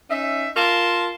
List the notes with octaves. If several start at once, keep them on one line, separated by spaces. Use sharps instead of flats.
C#4 D#4 E5
F4 A#4 A5 C6